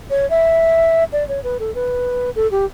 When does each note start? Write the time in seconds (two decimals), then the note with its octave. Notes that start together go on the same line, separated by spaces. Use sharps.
0.10 C#5
0.30 E5
1.12 D5
1.28 C#5
1.44 B4
1.60 A4
1.75 B4
2.36 A4
2.51 G4